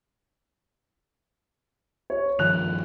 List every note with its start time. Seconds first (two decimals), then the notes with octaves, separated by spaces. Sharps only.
2.10 C#5
2.39 G2 D#3 F3 F#6 F7